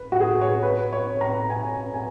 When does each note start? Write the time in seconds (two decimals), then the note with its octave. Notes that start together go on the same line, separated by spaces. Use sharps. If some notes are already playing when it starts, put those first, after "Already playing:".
Already playing: B4
0.12 F#4
0.20 G#4
0.41 C#5
0.63 B4
0.93 C#5
1.21 A#5
1.50 G#5
1.94 G#5